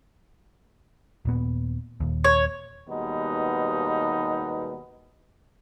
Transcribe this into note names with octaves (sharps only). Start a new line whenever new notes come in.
D#1 A#2 B3
D#1 D#2
C#5
D#2 B2 G3 G#3 B3 D#4